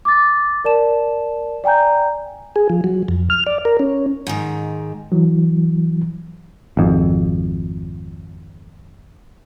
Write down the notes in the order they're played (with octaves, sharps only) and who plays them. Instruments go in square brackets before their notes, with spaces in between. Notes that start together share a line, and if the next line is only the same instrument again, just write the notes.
[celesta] D6 A6
A#4 D5 A5 E7
D5 G5 G#5 A#5 G6
[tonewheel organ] G#4
F3
F#3
F2
F6
D5
A#4
C#4
[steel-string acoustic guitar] G#2 D#3
[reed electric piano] E3 F#3
[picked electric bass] G#1 F2